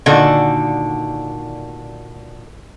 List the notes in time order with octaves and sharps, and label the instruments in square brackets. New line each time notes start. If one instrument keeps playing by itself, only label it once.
[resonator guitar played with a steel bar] A#2 D3 D#3 F#4 A4